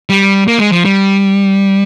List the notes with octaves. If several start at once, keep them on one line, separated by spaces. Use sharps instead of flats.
G3
A#3
G#3
F3
G3